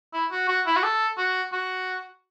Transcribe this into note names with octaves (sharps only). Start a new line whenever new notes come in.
E4
F#4
F#4
E4
F#4
A4
F#4
F#4